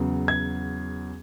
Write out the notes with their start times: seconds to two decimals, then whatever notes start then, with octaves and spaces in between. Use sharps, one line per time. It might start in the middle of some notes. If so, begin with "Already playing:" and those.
Already playing: E2 C#3 F#3
0.28 G#6